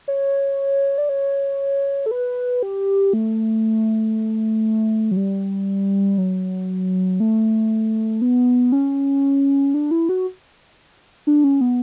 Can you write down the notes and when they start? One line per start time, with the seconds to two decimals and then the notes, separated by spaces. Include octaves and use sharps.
0.08 C#5
0.98 D5
1.09 C#5
2.06 A4
2.11 B4
2.63 G4
3.13 A3
5.11 F#3
5.17 G3
6.18 F#3
7.20 A3
8.22 B3
8.72 C#4
9.74 D4
9.91 E4
10.09 F#4
11.27 D4
11.44 C#4
11.61 B3